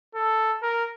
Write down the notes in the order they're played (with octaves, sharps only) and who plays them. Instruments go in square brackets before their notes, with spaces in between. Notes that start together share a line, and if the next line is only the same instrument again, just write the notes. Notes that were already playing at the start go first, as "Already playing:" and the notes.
[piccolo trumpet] A4
A#4